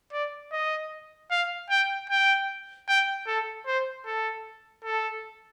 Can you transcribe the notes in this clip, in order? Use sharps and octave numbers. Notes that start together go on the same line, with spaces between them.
D5
D#5
F5
G5
G5
G5
A4
C5
A4
A4